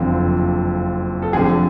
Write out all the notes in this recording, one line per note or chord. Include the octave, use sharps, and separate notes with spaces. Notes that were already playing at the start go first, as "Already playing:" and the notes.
Already playing: F#1 F2 D3
A4
F1 F2 D3 G#4